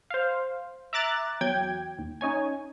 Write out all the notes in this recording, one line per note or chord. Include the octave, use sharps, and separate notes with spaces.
C5 F5
E5 A#5 D6 F#6 A6
E2 F#3 G5 G#6
D#2
C#4 D#4 C#5 G#5